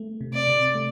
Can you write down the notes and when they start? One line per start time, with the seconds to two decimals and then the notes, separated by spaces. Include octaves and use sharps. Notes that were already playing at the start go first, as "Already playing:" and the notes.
Already playing: A3
0.21 C3
0.34 D5
0.48 C3
0.75 A3